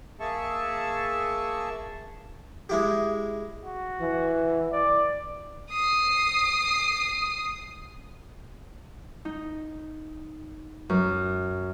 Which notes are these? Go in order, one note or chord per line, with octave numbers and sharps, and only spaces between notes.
A#3 G#4 E5 A5 C#6
G#3 E4 G4
F#4
E3
D5
D#6 C7
D#4
F#2